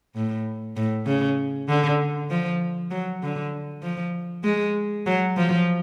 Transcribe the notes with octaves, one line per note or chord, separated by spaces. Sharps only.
A2
A2
C#3
D3
F3
F#3
D3
F3
G#3
F#3
F3